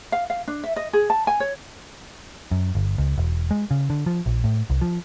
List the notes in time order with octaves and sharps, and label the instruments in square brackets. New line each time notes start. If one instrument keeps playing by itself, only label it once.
[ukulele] F5
F5
D4
E5
D#5
G#4
A5
G#5
C#5
[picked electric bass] F#2
G1
C#2
E1
G#3
C#3
D3
F3
A#1
A2
C2
F3